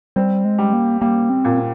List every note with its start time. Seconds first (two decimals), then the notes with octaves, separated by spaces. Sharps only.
0.16 G3 C4
0.45 G#3
0.58 G3
0.73 A#3
1.01 G3 A#3
1.30 C4
1.45 A#2